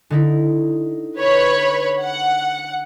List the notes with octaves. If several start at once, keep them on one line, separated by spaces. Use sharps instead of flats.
D3 D#4 E4
B4 C#5 B5
F#5